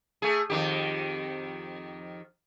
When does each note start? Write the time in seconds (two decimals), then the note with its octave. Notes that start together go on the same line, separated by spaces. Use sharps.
0.22 A3 G#4
0.50 F2 D#3 G4